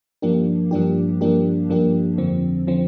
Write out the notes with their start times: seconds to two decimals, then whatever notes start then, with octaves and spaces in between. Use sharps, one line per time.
0.22 G2 F3 A#3 D4 G4
0.71 G2 F3 A#3 D4 G4
1.21 G2 F3 A#3 D4 G4
1.69 G2 F3 A#3 D4 G4
2.18 F2 D3 F3 C4
2.67 D3 F3 C4